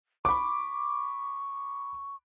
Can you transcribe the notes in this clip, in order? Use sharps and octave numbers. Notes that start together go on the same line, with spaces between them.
B5 C#6 D6